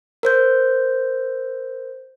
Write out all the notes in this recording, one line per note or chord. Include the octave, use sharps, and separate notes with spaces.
A#4 C5 G6